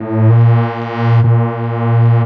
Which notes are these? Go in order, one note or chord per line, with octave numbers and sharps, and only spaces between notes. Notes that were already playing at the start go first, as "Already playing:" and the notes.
Already playing: A2
A#2
A#2